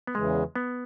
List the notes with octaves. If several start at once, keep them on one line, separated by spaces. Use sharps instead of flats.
B3
E2 C#3 E3 G#3
B3